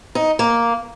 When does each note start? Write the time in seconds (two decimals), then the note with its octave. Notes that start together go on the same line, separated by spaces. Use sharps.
0.15 D#4
0.39 A#3